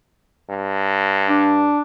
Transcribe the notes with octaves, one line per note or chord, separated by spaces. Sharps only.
G2
D4